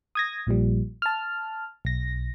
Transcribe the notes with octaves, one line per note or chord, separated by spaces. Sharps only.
D#6 G#6 A#6
A#1 A#2 F3 G3
A5 F6
B1 A#6